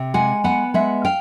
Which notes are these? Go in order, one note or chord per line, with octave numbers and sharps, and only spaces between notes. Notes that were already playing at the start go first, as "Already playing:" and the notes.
Already playing: C3
G#3 F#5 G#5
B3 F#5 G#5
G#3 E5 F#5
F5 G5